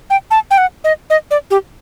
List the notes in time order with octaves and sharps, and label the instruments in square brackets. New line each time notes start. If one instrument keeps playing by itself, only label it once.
[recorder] G5
A5
G5
F#5
D#5
D#5
D5
G4